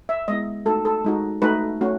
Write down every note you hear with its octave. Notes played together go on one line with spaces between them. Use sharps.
E5
G#3 B3 E4 D#5
A3 D#4 F#4 A4
A4
G#3 D#4 F#4
A3 D#4 F#4 B4
A3 C#4 F#4